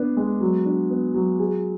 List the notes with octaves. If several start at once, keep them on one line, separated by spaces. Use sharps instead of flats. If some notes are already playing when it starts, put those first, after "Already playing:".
Already playing: B3 D4
G#3
F#3
D4
B3
F#3
G#4